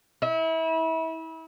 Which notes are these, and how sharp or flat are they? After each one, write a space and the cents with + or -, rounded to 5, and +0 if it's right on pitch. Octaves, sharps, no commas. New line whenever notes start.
E4 -30